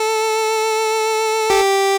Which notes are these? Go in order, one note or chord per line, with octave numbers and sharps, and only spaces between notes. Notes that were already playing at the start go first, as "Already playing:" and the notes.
Already playing: A4
G4